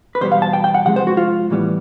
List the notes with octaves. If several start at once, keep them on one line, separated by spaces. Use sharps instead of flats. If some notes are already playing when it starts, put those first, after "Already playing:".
B4
E2 B2 G3 B3 C5
F5
A5
G5
G5
F#5
C3 F3 G#3 F#5
C5
F#4
F4
A2 E3 G3 B3